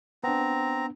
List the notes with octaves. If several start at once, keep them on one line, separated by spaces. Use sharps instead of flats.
B3 C4 D4 A#5